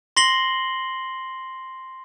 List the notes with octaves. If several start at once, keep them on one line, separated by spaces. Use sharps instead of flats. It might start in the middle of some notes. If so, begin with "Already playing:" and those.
C6 A#6 C7 F#7 G7